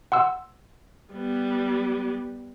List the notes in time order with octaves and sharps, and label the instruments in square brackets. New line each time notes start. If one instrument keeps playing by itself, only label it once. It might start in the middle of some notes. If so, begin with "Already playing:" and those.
[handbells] F#5 C6 E6
[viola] G3 B3